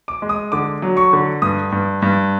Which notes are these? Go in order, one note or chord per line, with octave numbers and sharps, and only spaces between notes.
D6
G#3
D#6
D3 D6
F#3
C#6
D3
G2 D#6
G2
G2